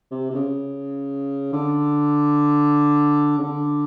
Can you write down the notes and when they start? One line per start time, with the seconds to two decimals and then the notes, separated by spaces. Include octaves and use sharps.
0.11 C3
0.30 C3
0.35 C#3
1.53 D3
3.38 C#3
3.43 D3